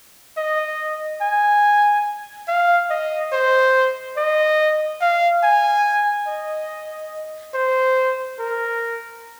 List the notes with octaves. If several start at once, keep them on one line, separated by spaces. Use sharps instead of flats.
D#5
G#5
F5
D#5
C5
D#5
F5
G#5
D#5
C5
A#4